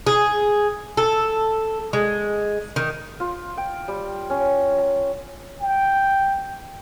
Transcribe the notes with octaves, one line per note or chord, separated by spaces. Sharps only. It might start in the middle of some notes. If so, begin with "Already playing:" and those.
G#4
A4
G#3
D#3
F4
G5
G3
C#4
A5
G5